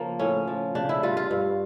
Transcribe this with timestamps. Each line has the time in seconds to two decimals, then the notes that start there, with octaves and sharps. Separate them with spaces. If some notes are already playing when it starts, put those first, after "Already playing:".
Already playing: C#3 F3 A#3
0.19 A2 C#4
0.47 F3
0.75 C#3 D4
0.89 E4
1.03 G3 F4
1.17 F4
1.31 G2